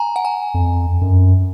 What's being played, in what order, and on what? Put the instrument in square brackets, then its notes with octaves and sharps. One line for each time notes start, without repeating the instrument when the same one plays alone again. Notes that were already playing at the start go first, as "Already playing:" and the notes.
Already playing: [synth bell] G#5 A#5
F#5
G#5
[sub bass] F2
F#2